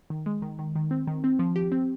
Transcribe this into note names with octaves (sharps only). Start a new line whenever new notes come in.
D#3
G#3
D#3
D#3
D#3
C4
D#3
C4
F3
G4
C4